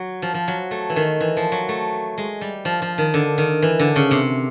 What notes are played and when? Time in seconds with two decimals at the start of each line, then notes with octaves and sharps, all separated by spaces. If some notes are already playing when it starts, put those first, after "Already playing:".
Already playing: F#3
0.22 F3
0.34 F3
0.48 F#3
0.71 A3
0.90 E3
0.96 D#3
1.21 E3
1.37 F3
1.52 F#3
1.69 A3
2.18 G#3
2.41 G3
2.65 F3
2.82 F3
2.98 D#3
3.14 D3
3.38 D#3
3.62 E3
3.80 D3
3.96 C#3
4.11 C3